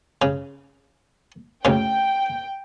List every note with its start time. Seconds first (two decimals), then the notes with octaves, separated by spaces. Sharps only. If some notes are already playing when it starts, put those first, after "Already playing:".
0.22 C#3
1.65 D2 C#3 G5